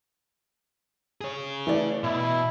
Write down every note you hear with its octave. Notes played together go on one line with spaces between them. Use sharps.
G#4 C#5
E3 A3 D5
B2 E4